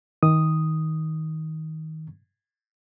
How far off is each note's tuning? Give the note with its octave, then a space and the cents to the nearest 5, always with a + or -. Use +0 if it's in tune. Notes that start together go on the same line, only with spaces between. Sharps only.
D#3 +20 D#6 +0